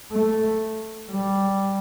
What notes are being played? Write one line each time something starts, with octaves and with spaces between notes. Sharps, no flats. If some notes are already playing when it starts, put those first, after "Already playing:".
A3
G3